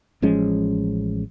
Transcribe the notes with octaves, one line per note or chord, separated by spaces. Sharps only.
A1 F3 G#3 C#4